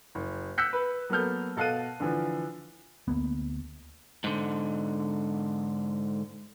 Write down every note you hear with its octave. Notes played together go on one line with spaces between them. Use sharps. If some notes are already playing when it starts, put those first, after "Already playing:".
F#1
E6 F#6 G6 B6 C#7
B4
F#3 A#3 B3 A4 F6 G6
B2 A4 F5 F6 F#6 D#7
D3 E3 F3
D2 A#3 B3
G#2 D3